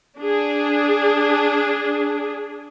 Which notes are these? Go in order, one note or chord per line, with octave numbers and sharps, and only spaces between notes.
D4 G#4